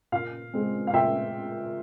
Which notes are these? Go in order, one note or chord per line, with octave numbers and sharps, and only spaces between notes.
A#2 F5
G#3 C4
F5
A#2 E5 G5